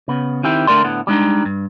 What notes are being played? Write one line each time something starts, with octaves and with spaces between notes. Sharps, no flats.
C#3 B3
D#3 C4 E4 G4
D3 A3 A#4 D5 C6
A2 D3 B3
G3 G#3 D4 D#4
G2